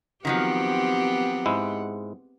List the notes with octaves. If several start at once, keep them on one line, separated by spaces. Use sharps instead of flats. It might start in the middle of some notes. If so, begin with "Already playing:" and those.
D#3 F3 F#3 B3 C4 G4 F#5
G#2 G#3 E4